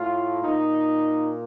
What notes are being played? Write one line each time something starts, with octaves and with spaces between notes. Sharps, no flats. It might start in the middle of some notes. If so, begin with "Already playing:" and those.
Already playing: A2 F4
A#2 D#4